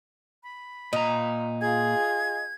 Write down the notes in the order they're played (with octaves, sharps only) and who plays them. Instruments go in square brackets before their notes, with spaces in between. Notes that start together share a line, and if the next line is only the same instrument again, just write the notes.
[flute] B5
[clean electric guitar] A#2 A#5 [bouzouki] D#4
[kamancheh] F4 G#4 [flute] G#6